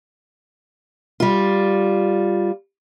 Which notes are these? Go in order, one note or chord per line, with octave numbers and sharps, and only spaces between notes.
G3 F4